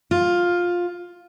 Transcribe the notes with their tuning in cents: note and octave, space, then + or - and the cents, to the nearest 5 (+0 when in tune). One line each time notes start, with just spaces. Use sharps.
F4 +10